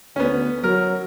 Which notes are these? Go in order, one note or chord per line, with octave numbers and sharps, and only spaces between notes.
D2 B3 C#4
F#3 A#4